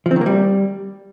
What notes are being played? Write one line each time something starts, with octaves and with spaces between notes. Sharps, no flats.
F3
C4
D#3
A#3
G3